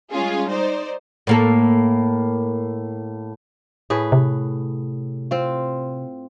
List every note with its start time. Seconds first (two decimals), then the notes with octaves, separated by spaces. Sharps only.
0.11 G3 G#3 C#4 F4 G#4
0.49 D#4 C5 D5
1.27 A2 A#3 A4
3.90 A2 G#4 B4
4.12 C3
5.31 C4 F4